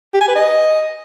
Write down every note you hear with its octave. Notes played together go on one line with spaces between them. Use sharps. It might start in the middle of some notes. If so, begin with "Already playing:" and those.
G4
G#5
B4
D#5